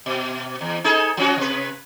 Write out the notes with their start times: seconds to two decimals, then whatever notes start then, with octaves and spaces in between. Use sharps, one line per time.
0.06 B2
0.61 E2
0.84 D#4 G#4 A4
1.17 F3 C#4 F#4
1.38 C3 B4